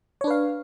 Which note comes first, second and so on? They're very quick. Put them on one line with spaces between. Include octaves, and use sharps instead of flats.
C#5 D4 B4 F5